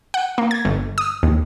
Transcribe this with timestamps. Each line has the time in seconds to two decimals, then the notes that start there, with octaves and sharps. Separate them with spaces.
0.14 F#5
0.38 A#3
0.51 G#6
0.65 G1
0.98 D#6
1.23 D#2